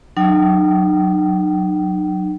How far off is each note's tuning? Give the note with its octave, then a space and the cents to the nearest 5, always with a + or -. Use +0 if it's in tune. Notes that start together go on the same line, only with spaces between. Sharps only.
F#3 +0 D#4 -40 G5 -35